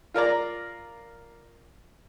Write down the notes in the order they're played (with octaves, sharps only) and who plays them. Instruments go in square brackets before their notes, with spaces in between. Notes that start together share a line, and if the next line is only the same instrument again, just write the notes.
[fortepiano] F4 A#4 D5 A#5